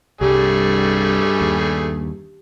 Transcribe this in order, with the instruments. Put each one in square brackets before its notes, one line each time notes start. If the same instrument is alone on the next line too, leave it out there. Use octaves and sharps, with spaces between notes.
[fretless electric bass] C2 [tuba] G2 [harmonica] G3 A3 G#4 [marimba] G4
[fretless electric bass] D#2